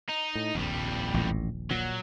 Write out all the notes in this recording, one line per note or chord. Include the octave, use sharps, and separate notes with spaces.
D#4
A2
D#1 A#1 F2 G3
A1 A2
A#2 F#3